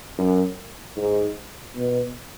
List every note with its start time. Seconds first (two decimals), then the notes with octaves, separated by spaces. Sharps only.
0.18 F#2
0.97 G#2
1.76 B2